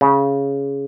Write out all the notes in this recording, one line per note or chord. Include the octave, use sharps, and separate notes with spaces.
C#3